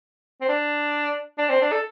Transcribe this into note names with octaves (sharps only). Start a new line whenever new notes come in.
C4
D4
D4
C4
D4
A4